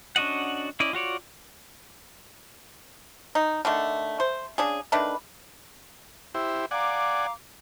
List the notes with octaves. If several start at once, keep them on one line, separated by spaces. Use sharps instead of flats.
C#4 D4 F#4 D#5 F#5
C#4 E4 D5 D#5
F4 F#4 C#5 D5
D#4
D3 D#3 A3
C5
C#3 D4 G#4
D#3 A3 D4 B4
E4 G4 C5 E6
D5 F5 F#5 G#5 A#5 D6